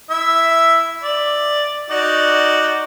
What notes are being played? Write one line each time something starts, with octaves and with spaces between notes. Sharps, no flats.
E4 E5
D5
D#4 F#4 D5